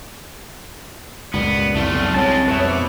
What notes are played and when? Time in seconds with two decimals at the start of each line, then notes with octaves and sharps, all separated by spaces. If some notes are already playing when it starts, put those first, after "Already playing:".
1.34 C#2 G2 A#2 B3 D5
1.75 C2 F2 A2 A3 F4
1.92 B1 F2 C#3
2.14 C2 F#2 G#3 C#5 A5
2.48 F2 G#2 B2 B4 E5
2.67 D6